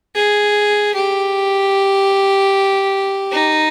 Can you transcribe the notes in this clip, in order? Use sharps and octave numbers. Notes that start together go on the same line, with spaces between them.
G#4
G4
D#4